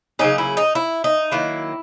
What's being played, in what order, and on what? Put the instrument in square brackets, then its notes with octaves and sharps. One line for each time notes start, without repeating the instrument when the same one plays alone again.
[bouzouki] C#3 F#3 A#3 C#4 D#4
E4
D#4
E4
D#4
D#3 F#3 A#3 E4